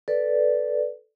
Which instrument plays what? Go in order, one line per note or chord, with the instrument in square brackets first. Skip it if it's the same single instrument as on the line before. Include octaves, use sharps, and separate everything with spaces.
[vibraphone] A4 B4 D5